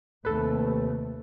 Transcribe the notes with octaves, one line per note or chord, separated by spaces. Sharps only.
D#2 C3 A3 A4 B4